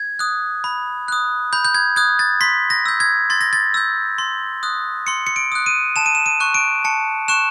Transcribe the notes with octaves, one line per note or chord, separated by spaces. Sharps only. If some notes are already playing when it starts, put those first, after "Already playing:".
Already playing: G#6
D#6 F#6
B5
D#6 F#6
B5 G6
G6
G#6
D#6 F#6 G#6
A6
C6 B6
A#6
E6 G6
G#6
C6 A6
A#6
A6
E6 G6
C6
D#6 F#6
C6 C#7
C#7
D7
D#6 F#6
D#7
A5 E7
D#7
E7
D#7
C#6 F#6
D7
A5 C#7
C#6 F#6 E7